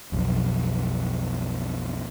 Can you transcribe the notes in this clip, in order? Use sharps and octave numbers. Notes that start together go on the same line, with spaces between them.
B1 F2